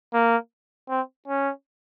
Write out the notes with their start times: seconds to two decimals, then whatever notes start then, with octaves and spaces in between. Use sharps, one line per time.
0.14 A#3
0.89 C4
1.28 C#4